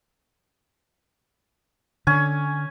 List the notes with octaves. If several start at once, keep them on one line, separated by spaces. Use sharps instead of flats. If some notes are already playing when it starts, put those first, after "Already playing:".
D3 C#4 G#5